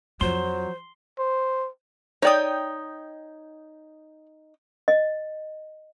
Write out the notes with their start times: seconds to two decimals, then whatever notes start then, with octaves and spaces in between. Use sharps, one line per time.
0.21 F2 F3 F#3 C5 C6
1.19 C5
2.22 D#4 C#5 D5 G5 D#6
4.88 D#5